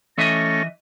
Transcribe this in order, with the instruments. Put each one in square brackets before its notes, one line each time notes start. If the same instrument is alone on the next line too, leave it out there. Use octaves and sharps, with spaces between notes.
[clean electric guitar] E3 D#5 E5 [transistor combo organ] A3 C#4 [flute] A#6